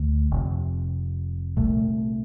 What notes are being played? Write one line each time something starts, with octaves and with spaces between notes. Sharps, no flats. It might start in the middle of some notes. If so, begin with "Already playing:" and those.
Already playing: D2 D3 A3
F1 F2 C3
C2 A#2 A3